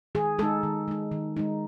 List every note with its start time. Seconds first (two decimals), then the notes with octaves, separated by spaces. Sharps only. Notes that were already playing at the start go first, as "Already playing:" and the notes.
0.15 D#3 G#4
0.39 G#3 D#4 A4
0.63 D#3
0.88 G#3 D#4
1.12 D#3
1.37 G#3 D#4